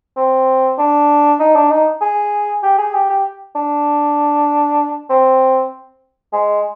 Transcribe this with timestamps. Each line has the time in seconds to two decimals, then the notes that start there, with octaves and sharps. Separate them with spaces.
0.17 C4
0.78 D4
1.40 D#4
1.55 D4
1.71 D#4
2.01 G#4
2.63 G4
2.78 G#4
2.94 G4
3.10 G4
3.55 D4
5.10 C4
6.33 G#3